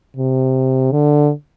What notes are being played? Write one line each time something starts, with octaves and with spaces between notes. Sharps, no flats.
C3
D3